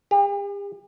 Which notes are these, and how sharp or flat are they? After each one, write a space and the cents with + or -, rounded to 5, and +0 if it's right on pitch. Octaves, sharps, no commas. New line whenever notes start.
G4 +45